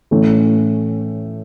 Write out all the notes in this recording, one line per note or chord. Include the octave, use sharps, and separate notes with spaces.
A2 E3 A3 C#4